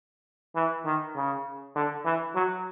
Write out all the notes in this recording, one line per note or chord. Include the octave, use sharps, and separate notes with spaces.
E3
D#3
C#3
D3
E3
F#3